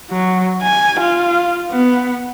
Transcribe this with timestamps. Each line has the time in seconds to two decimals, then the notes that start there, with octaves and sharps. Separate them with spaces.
0.10 F#3
0.63 G#5
1.01 F4
1.71 B3